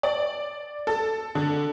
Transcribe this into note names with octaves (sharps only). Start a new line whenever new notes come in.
D5
A4
D3